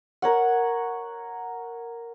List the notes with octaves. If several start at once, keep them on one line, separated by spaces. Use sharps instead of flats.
A#4 C#5 F#5